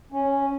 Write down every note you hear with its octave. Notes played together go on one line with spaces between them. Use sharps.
C#4